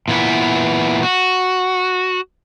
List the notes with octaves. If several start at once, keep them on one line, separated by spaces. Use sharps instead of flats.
A#2 E3 B3 E4
F#4